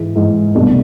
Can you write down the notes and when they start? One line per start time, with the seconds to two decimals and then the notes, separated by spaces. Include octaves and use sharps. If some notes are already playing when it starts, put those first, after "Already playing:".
Already playing: G#2 E3 G#3
0.16 G#2 E3 G#3
0.55 C2 B2 A3 D4